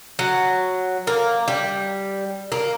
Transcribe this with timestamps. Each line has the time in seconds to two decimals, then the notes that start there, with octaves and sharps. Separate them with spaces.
0.19 F#3
1.07 A#3
1.48 G3
2.52 A#3